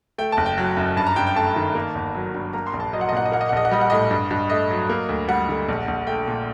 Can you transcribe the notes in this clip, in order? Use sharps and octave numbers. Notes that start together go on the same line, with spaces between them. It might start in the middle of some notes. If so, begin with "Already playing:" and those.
A3 G5
F#1 A5
G5
F#3
F#2
G2 A5
A#5
G2 G5
G5
A3 A5
D#3
A#3
G1
F#3
G2
A#3 A#5
C6
A#1
A5
F#3 D#5
F#5
D#5
A#2 F#5
D#5
A#3 F#5
D#5
F#5
A#1 D#5
F#5
G3 D#5
F#5
A2 D#5
G2
G2
A3 D#5
F#3
A#3
D2
G3 F#5
D3
A#1
A#1
A3 G5
A#2